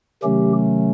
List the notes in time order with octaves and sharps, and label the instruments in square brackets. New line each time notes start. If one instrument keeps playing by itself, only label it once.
[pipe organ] C3 D#3 F#3 A3 C#4 G4